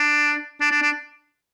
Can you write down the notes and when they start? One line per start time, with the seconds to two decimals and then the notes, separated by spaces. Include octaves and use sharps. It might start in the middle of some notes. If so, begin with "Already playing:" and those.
Already playing: D4
0.61 D4
0.71 D4
0.82 D4